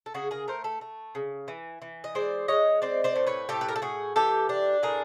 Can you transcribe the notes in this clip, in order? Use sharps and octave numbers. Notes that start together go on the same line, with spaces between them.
A4
C#3 F#4 G#4
G#4 A#4
A3 A#4 C5
A4 B4
A3
C#3
E3
E3
D#5
G#3 C5 D5
G#3 C#5 D#5
C4 C5 D5
C5 D5
A2
B4 C#5
A2 G4 A4
B4
A#4
A4
A2 F#4 G#4
E3 G4 A4
D4
A2 G#4 A#4